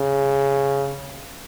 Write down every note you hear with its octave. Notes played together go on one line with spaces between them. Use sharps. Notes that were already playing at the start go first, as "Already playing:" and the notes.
Already playing: C#3